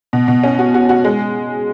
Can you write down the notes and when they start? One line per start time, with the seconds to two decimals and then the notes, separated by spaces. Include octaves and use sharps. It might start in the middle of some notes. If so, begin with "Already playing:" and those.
0.13 B2
0.28 B2
0.43 C#4
0.59 F#4
0.74 F#4
0.89 F#4
1.04 G#3